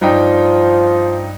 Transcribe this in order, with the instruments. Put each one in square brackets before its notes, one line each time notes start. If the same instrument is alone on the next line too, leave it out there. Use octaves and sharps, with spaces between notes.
[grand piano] G2 D#4 G5 [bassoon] F3